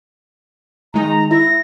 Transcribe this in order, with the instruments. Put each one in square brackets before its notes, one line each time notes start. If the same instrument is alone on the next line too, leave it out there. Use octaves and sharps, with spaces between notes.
[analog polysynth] D#3 G#3 D#4 [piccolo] A#5
[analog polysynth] E4 [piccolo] A#6